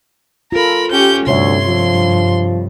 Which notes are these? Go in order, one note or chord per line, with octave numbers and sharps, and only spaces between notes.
F4 A4 A#4 B5
C#4 G4 G6
D2 G2 C3 C#5 E5 C6
F3